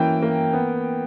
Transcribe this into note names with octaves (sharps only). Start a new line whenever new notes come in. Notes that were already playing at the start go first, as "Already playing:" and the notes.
Already playing: E3 A#3 C#4 G5
A#3
B3